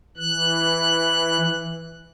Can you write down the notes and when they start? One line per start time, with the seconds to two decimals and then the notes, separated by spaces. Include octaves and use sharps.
0.17 E3 F#6